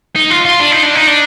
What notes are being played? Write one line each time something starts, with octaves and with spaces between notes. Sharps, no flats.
D#4
F4
F4
D4
D#4
D4
D#4
D4